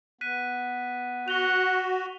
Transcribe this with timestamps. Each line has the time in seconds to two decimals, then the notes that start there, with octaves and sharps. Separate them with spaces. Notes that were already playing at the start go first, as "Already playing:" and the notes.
0.21 B3 F#6 B6 D#7
1.28 F#4 F#5 F7 G7